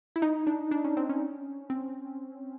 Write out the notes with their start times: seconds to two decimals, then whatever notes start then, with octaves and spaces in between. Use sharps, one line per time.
0.16 E4
0.22 D#4
0.47 D4
0.71 D4
0.84 C#4
0.97 C4
1.09 C#4
1.70 C4